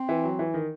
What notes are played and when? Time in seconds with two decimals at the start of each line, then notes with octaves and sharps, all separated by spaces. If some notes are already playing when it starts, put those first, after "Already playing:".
Already playing: C4
0.09 E3
0.24 F#3
0.39 E3
0.54 D#3